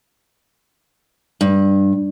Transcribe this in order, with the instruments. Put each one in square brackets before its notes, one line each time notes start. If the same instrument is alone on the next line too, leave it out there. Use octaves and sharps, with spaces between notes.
[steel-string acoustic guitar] G2